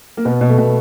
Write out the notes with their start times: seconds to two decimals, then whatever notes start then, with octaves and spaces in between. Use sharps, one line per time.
0.17 A#3
0.25 B2 B3
0.41 B2
0.49 A3
0.58 B2